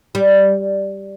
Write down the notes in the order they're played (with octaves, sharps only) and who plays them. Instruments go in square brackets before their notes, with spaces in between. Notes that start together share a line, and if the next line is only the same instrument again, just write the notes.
[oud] G3